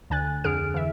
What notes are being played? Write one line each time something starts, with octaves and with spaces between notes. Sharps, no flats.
D2 D3 G#5 F#6 A6
F2 D3 G#4 F6 D7
E3 E5